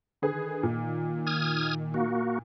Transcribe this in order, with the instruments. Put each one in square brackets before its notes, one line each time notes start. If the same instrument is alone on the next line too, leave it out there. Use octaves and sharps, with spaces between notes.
[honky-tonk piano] D3 G#4 B4 [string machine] D#3
[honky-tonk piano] A#2
[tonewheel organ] D#6 F6 G#6
A#3 F#4